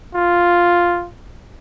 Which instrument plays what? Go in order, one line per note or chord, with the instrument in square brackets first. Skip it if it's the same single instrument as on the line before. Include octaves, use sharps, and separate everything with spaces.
[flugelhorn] F4